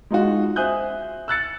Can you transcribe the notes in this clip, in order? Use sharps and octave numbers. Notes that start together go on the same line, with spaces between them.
G#3 D#4 F4 F#4
C5 E5 G#5 D#6 F#6 G6
E6 F#6 A6 C#7